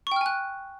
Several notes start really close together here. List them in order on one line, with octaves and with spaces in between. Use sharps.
C#6 G5 F6 G#5 F#6